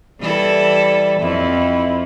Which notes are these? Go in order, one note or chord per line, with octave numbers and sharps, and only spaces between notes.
E3 G3 E4 A4
F2 E4